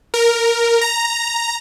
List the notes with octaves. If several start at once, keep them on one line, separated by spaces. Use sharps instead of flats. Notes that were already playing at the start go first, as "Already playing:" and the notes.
A#4
A#5